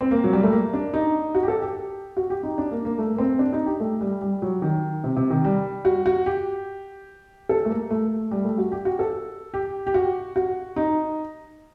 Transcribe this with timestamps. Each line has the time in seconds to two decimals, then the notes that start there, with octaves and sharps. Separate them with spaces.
0.01 C4
0.11 A#3
0.24 F#3
0.33 G3
0.43 A3
0.52 A#3
0.73 D4
0.94 D#4
1.35 F#4
1.43 G4
1.48 A4
1.62 G4
2.17 F#4
2.30 G4
2.43 D#4
2.58 D4
2.71 A#3
2.85 A#3
2.98 A3
3.14 A#3
3.18 C4
3.39 D4
3.53 D#4
3.66 G4
3.80 A3
4.01 G3
4.21 G3
4.42 F#3
4.62 D#3
5.04 C3
5.16 C3
5.30 D#3
5.45 G3
5.85 F#4
6.06 F#4
6.26 G4
7.49 A4
7.65 A3
7.70 A#3
7.90 A3
8.31 G3
8.44 A3
8.58 F#4
8.72 G4
8.85 F#4
8.99 A4
9.54 G4
9.87 G4
9.94 F#4
10.36 F#4
10.76 D#4